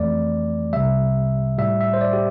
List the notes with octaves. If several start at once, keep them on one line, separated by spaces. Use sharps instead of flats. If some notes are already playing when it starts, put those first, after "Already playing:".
Already playing: F2 E3 A3 D5
C2 C3 G3 E5
A2 G3 E5
E5
C5
D5
G4